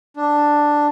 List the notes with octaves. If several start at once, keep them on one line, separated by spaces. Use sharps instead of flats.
D4